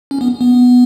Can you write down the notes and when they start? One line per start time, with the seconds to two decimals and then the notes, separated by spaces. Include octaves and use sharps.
0.11 C#4
0.21 B3
0.41 B3